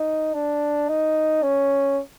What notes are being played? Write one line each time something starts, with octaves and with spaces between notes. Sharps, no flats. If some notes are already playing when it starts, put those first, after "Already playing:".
Already playing: D#4
D4
D#4
C#4